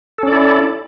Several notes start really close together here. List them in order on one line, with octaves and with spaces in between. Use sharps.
A4 C#4 D5 E4